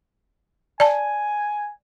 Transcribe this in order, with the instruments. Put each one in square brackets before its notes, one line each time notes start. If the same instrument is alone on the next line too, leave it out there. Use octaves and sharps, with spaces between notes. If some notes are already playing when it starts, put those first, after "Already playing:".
[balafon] D5 A5 [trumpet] G#5